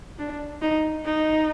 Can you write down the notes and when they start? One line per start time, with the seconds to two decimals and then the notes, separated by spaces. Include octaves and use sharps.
0.19 D4
0.62 D#4
1.05 D#4